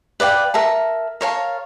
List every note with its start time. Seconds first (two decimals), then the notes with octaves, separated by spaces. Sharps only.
0.20 B4 D5 F5 G5
0.54 A#4 E5 A5
1.21 A#4 C#5 F5 A5